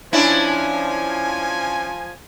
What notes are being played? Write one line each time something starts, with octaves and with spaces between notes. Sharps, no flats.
F3 C#4 D4 E4 G#5